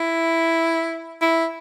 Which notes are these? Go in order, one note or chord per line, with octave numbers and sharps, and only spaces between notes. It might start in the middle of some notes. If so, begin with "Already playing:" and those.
Already playing: E4
E4